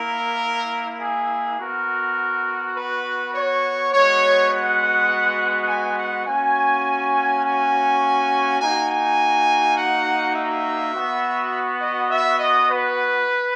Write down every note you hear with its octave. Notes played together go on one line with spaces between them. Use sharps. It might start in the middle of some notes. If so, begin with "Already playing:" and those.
Already playing: A#3 E4 A#4
G#4
B3 F#4 A#4
B4
C#5
G#3 B3 F#4 C#5
F#5
G#5
F#5
A#3 C#4 F#4 G#5
G#5
A#3 D#4 F#4 G#5
G#5
F#5
E5
B3 F#4
D#5
E5
D#5
B4